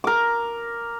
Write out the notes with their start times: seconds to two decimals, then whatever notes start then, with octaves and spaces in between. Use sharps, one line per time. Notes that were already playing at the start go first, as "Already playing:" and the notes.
0.04 A#4 D6